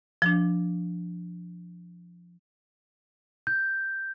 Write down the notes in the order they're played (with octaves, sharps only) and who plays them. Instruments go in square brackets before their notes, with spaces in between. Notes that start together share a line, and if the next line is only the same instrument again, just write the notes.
[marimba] F3 D4
[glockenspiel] G6